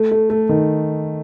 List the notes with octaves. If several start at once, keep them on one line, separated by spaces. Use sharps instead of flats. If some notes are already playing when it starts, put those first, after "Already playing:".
Already playing: A3
A3
A3
D#3